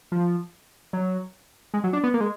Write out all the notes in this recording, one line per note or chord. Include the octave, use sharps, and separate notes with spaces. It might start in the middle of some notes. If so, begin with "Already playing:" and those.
F3
F#3
G#3
F#3
D4
B3
A#3
G#3